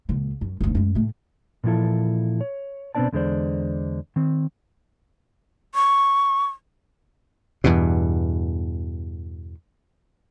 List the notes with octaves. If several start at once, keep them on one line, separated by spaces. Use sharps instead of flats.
C#2 A#2
F#2
F#1 D2
F#2 G#3
A2 A3
A#2 E3 F3 E4 A4
C#5
B2 B3 C4 D4 D5 A5
E2 D3 G#3 A#3 C5 D5
D#3 C4
C#6
E2 G2 B2